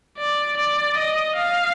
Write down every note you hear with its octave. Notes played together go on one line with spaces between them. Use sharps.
D5
D5
D#5
F5